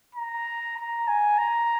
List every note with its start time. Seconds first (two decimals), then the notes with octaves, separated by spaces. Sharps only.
0.15 A#5
0.77 A#5
1.08 G#5
1.38 A#5